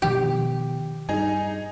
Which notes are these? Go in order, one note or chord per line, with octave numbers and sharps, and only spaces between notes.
B2 D#3 F3 G4
G2 D#4 G#4